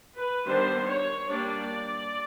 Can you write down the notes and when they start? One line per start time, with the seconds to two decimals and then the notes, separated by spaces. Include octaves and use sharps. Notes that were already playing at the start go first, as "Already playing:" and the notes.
0.18 B4
0.46 D#3 G3 B3 D4 C5
0.88 C#5
1.30 G3 A#3 D4 D5